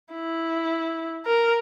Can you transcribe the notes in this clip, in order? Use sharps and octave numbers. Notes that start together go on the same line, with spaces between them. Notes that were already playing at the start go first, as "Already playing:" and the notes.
E4
A#4